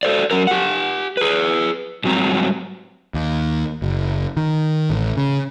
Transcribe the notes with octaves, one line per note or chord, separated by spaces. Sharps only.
A4 C5 D5
F#3 C#4 F#4 A#4
G4 F#5
G#4 B4
G#2 F#3 G3 C4 A#5
D#2
F#1
D#3
A1
C#3